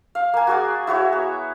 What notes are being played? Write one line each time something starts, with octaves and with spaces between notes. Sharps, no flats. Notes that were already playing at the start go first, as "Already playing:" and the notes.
F5
A#3 G#5
F#4 G#4 D5
E4 F#4 C#5
B3